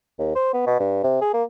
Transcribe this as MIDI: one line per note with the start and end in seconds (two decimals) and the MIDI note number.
0.19 0.35 39
0.35 0.52 72
0.53 0.63 59
0.66 0.77 47
0.79 1.02 43
1.03 1.18 48
1.21 1.32 68
1.34 1.43 58